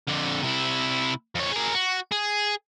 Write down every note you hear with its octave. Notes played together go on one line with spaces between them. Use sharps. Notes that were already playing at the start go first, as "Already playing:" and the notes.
F2 D3
C3 E4
F2 C#5
G#4 A#4
F#4
G#4